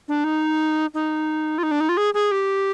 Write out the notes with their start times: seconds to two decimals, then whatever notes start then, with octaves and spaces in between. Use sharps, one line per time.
0.08 D4
0.24 D#4
0.94 D#4
1.58 F4
1.63 D#4
1.71 D4
1.80 D#4
1.89 F4
1.97 G#4
2.14 G#4
2.31 G4